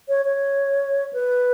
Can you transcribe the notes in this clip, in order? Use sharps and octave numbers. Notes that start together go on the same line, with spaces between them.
C#5
C#5
B4